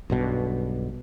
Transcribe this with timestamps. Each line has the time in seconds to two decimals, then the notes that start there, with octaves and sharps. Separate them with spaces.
0.10 B1 G2 B2